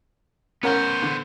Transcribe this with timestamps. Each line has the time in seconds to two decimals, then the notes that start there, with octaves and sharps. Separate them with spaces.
0.63 B3 C#4 A#4 C5 F#5
1.02 D3